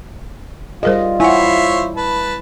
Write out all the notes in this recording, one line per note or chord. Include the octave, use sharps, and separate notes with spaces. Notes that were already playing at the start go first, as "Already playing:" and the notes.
G3 F4 G#4 A#4 C5 D#5
E4 C5 C#5 E5 F#5 G#5
B4 A5